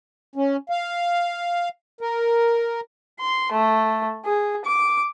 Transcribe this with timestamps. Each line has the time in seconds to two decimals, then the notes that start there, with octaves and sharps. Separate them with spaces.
0.36 C#4
0.70 F5
2.01 A#4
3.20 C6
3.52 A3
4.26 G#4
4.65 D6